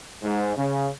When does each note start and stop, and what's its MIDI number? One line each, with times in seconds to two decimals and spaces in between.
0.22 0.54 44
0.57 0.88 49